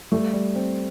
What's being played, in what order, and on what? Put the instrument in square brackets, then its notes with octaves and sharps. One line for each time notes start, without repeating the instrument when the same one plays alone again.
[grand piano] G3 [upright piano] A3
[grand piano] G3
C4